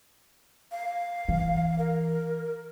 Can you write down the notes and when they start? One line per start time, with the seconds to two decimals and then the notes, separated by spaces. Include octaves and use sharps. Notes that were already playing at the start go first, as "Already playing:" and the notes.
0.71 F5
1.28 E3
1.79 A#4